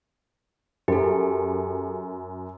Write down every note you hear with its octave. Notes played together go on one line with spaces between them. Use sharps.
F#2 G4 A4